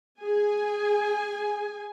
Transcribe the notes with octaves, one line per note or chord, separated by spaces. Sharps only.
G#4 G#5